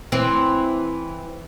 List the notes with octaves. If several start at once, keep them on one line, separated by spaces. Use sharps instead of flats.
E3 C4